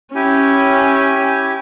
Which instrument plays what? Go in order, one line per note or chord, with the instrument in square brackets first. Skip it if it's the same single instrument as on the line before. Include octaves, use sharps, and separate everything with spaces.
[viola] C#4 [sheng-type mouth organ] E4 G4 G#5